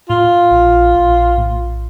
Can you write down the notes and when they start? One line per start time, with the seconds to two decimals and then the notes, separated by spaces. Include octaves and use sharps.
0.09 A2 F4
0.51 A#1
0.95 A#1
1.38 A2